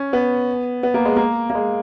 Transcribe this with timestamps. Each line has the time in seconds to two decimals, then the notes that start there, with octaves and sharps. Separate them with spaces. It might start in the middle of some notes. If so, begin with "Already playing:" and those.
Already playing: C#4
0.13 B3
0.83 B3
0.94 A#3
1.05 G#3
1.16 A#3
1.50 A#3
1.55 G#3